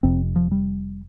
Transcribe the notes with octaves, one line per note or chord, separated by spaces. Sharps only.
F1 F2 C3 C4
F3
G3